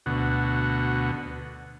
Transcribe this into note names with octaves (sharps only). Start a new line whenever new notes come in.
D2 B2 F#4